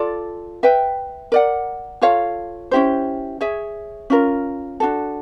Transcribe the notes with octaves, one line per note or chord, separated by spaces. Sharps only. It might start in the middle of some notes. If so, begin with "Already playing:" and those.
Already playing: F4 A4 D5
B4 E5 G5
A#4 D5 F#5
F4 A4 C#5 F5
C#4 E4 G4 C5
G#4 C#5 E5
C#4 F4 A#4
D4 F#4 A4